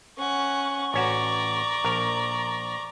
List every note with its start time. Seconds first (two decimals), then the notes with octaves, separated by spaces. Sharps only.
0.18 C#4 F#5 C#6
0.94 A1 C#4 F#4 D5 A#5
1.84 A#1 A#4